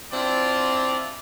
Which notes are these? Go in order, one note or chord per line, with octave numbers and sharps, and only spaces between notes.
C4 D4 E4 F4 D5